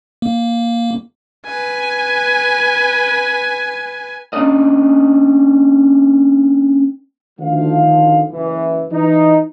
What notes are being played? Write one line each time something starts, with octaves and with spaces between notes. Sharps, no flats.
A#3
B4 G#5
A#3 C#4 D4 D5 D#5
D2 D#3 F3 F5
F#1 E3
E3 D#4